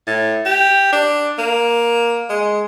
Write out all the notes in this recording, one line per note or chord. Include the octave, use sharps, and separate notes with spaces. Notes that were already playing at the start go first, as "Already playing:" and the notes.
A2
G4
D4
A#3
G#3